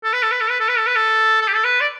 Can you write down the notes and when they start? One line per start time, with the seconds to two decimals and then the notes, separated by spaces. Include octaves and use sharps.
0.04 A4
0.13 B4
0.23 A4
0.32 B4
0.40 A4
0.50 B4
0.59 A4
0.69 B4
0.77 A4
0.87 B4
0.95 A4
1.41 A4
1.48 G4
1.55 A4
1.64 B4
1.80 D5